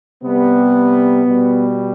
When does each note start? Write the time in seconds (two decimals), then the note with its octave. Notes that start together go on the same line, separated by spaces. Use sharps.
0.22 C3 G3 B3
1.25 B2 G3